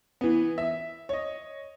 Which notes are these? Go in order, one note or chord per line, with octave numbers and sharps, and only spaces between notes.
E3 B3
E5
C#5 D#5